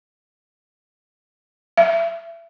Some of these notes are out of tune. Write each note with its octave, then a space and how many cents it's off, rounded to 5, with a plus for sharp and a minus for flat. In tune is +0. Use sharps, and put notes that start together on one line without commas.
E5 +25